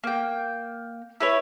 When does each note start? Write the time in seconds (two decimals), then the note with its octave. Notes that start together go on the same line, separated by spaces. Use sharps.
0.04 A#3 G5
1.20 E4 B4 C#5